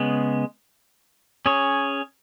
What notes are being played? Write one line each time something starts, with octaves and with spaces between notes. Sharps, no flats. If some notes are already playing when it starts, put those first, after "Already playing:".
Already playing: C#3 G#3 B3
C#4 G#4 C#5